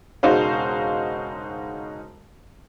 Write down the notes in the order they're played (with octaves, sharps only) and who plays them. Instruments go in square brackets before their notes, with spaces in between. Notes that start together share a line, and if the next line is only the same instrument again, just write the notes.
[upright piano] E1 C#3 D#4 F#4 C5 F5